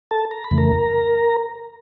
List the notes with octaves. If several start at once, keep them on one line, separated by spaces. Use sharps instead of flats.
A4 A5
A#5
B5
F2 C#3 E3 A3
A#4 A#5